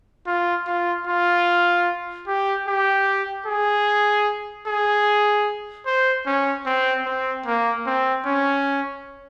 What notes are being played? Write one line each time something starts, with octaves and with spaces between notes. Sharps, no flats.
F4
F4
F4
G4
G4
G#4
G#4
C5
C#4
C4
C4
A#3
C4
C#4